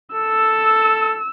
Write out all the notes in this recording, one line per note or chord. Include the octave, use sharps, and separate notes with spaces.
A4 E6